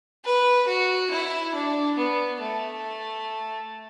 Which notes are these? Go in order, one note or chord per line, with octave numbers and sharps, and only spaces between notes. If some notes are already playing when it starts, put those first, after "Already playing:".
B4
F#4
E4
D4
B3
A3